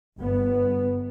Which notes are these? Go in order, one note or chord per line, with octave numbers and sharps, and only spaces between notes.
G1 B3